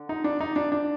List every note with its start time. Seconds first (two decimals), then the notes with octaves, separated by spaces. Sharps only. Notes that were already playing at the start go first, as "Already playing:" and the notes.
Already playing: D3
0.09 D#4
0.24 D4
0.40 D#4
0.56 D4
0.72 D4